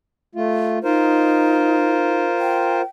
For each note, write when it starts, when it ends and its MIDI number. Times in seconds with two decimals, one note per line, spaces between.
0.35 0.78 57
0.35 0.78 65
0.84 2.24 63
0.84 2.82 65
0.84 2.82 70
0.84 2.82 72
2.39 2.85 79